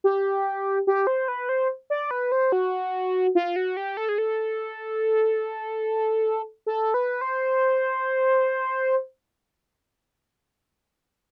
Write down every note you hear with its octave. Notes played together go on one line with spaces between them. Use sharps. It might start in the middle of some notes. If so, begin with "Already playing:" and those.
G4
G4
C5
B4
C5
D5
B4
C5
F#4
F4
F#4
G4
A4
G#4
A4
A4
B4
C5